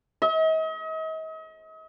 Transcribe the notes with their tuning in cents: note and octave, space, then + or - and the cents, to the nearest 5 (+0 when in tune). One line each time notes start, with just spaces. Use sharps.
D#5 +40